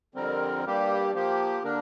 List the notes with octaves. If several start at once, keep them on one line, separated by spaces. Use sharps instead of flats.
F2 D3 G3 C4 A#4
G2 G3 A#3 G4
F3 A#3 G4
D3 A#3 D4 A#4